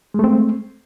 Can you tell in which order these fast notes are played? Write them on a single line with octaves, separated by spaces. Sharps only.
G#3 A3 C4